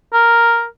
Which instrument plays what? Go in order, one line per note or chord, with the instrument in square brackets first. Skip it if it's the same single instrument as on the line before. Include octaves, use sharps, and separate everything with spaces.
[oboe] A#4